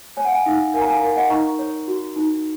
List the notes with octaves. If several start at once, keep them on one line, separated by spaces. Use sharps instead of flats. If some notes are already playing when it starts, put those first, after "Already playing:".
C#5 G#5
F#5
F5 G#5
D#4
A#4 F5 G#5
A#5
F5 G#5
A#4
D#5 F#5
D#4 A#5 C#6
C#5
F#4
D#4